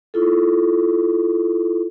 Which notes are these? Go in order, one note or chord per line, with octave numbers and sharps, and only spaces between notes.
E4 F4 A4